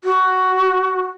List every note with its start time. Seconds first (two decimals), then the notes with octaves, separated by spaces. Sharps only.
0.04 F#4